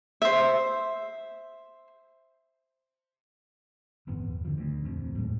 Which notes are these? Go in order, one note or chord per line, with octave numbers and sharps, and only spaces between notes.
C5 E5
D1 G1 E2 B3
D3 F3
D2
D#1 F2
A2 F#3 G#3